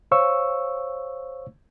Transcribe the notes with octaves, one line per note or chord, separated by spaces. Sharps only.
C5 C#5 F5 C#6 E6